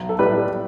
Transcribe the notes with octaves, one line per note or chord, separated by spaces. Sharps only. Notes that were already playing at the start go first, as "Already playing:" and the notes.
Already playing: B1
A4
A2 G3 B4